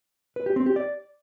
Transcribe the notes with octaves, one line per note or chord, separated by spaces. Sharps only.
B4
G4
C4
G4
D5